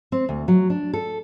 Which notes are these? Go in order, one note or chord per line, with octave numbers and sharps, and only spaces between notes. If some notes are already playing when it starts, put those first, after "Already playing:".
C4
D2
F#3
D4
A4